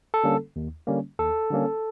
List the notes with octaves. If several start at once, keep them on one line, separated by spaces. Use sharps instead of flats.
A4
D3 G3 A#3 C#4
D#2
D3 G3 A#3 C#4
D#2 A4
D3 G3 A#3 C#4